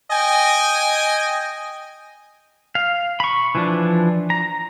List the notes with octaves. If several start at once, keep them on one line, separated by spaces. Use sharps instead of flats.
D#5 G5 G#5
F5
B5 C#6
E3 F3 D4
A#5